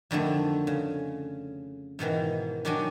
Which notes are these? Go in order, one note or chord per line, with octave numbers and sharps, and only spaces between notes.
F2 D3 D#3 A3
C#3
G#2 B2 D#3 E3
D#3 F#3 D4 F#4 G5 G#5